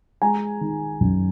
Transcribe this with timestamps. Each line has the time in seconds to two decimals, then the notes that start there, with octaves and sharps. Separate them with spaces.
0.22 G#3 G#5 A#5
0.61 D#3
1.01 F#2